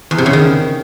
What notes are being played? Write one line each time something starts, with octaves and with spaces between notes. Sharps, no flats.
E2
C3
C#3
D#3